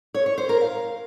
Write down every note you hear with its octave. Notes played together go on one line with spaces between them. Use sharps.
C#5
C#5
C5
A#4
F5